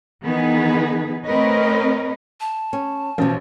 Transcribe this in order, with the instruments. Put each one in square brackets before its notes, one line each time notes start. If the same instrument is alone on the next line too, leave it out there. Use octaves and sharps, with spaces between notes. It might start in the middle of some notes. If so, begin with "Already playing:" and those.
[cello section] D#3 E3 B3 D#4 G#4 B4
A3 C4 A#4 B4 C#5 D#5
[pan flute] A5
[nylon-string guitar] C#4
[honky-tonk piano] A1 [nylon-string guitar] B2 F3